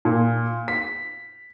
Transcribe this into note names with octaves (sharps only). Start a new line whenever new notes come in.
A#2
B6